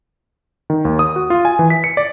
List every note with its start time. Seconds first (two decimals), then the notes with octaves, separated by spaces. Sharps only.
0.70 D#3
0.85 D#2
0.99 D#6
1.16 F#4
1.30 F4
1.45 G#5
1.59 E3
1.70 B6
1.84 C#7
1.97 D5